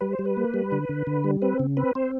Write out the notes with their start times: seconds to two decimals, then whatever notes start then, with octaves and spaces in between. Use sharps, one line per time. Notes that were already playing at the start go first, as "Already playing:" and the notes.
0.01 G3 B4
0.13 C5
0.19 G3
0.25 B4
0.37 A#3
0.54 G3
0.72 D3
0.89 D3
1.07 D3
1.24 G3
1.42 C4 B4
1.59 C#3
1.77 C4 B4
1.95 C4 C5